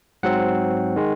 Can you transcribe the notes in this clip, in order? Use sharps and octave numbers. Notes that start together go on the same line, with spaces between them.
G#2 F#3 C4 F#5
D#3 G#3